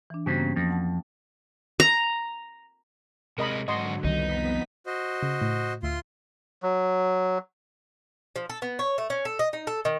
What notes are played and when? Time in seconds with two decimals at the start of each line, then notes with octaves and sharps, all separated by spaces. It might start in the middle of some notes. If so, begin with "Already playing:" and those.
0.10 E3 D4
0.26 G2 C#3 B3 F#4 C5
0.38 A#3 C#4
0.56 F2
0.70 F#5 A5
1.80 A#5
3.38 C3 G#3 A#4 D#5 B5
3.68 G#2 D3 F#3 F#4 D#5 C6
4.04 C2 F2 D#3 G3 B3 D#4 B6
4.86 F#4 C5 D#5
5.23 C#3
5.41 A2
5.83 D2 F4 E5 C6 C7
6.63 F#3
8.36 F3
8.50 A4
8.62 B3
8.79 C#5
8.98 A3
9.10 C#4
9.25 A4
9.39 D#5
9.53 D#4
9.67 A4
9.85 D#3